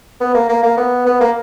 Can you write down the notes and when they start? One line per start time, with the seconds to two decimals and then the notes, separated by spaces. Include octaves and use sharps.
0.20 B3
0.34 A#3
0.49 A#3
0.63 A#3
0.77 B3
1.06 B3
1.20 A#3